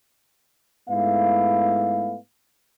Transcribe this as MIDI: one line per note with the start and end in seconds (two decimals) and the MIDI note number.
0.89 2.16 44
0.89 2.16 57
0.89 2.16 59
0.89 2.16 64
0.89 2.16 77